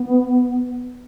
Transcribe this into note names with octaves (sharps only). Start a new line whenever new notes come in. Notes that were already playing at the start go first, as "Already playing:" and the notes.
Already playing: B3